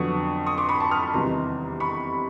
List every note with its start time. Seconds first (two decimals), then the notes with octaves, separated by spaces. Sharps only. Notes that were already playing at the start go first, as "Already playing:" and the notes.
Already playing: F2 D3 F#3 B3 C#6 D#6
0.47 C#6 D#6
0.58 C6 D6
0.69 B5 C#6
0.80 A5 B5
0.91 D#6 F6
1.03 A5 B5
1.14 E2 C3 D#3 G3 B3 A#5 C6
1.80 B5 C#6